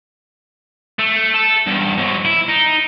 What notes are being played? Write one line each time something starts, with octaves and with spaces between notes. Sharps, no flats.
A3
A4
E2 G2
G#2 F#3
E4
D#4